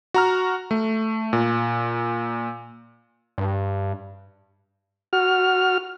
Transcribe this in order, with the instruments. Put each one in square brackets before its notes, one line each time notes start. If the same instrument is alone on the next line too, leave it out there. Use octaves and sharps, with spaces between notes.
[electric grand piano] F#4 A#5 F6
A3
A#2
[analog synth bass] G2
[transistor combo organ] F#4 F6